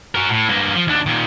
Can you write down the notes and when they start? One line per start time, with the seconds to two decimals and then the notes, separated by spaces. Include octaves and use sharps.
0.15 F#4 A#4
0.30 A2
0.49 G2 A#3
0.75 F3
0.87 D#2 D4
1.06 A#2 D#3